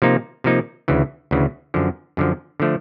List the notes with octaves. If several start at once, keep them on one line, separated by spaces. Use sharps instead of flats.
C3 F3 A#3 D#4
C3 F3 A#3 D#4
D2 C#3 E3
D2 C#3 E3
F#2 D3 F3
F#2 D3 F3
D3 F3 A3